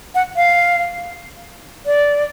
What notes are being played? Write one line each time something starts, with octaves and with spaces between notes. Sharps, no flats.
F#5
F5
D5